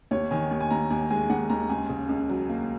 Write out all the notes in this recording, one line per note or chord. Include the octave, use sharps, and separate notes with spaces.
D#2 C#5
D#3 G#5
D#2
G#5
D#2 A#5
D#2 G#5
G#3 G#5
D#2 F#5
D#2 A#5
C#2 G#5
C#3
C#2
F#3
A#3